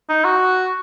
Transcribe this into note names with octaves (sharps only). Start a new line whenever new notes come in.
D#4
F#4